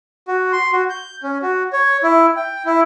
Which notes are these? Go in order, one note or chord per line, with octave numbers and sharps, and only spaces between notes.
F#4
C6
F#4
G6
C#4
F#4
C#5
E4
G5
E4